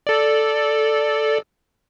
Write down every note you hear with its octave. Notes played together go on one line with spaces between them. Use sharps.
A4 D5